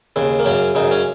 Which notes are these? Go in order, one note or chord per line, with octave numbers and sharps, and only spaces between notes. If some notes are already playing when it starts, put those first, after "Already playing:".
D#2 C#3
A#3
F#2 C#3 C#4
F#2 C#3 D#4
C#4